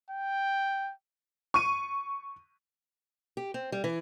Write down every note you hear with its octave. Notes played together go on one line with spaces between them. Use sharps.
G5
C#6 D#7
G4
C4
G3
E3